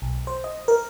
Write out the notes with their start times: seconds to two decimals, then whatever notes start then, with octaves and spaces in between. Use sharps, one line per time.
0.02 B1
0.27 C5
0.44 D#5
0.68 A#4